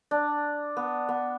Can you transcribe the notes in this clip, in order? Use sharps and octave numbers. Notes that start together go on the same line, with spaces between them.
D4
B3
B3